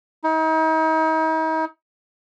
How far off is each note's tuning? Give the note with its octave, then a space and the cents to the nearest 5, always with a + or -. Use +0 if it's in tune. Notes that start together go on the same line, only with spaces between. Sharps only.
D#4 +40